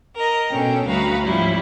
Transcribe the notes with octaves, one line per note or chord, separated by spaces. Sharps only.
A#4 D#5
B2 C#4 D4 A4 G5
D2 G3 F#4 B4 F5 A#5
G#2 F3 G3 C#4 E4